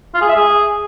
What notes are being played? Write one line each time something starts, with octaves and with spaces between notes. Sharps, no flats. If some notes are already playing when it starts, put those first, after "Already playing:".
F4
G#4
E5
G#4